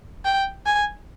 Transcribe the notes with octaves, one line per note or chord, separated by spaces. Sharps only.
G5
G#5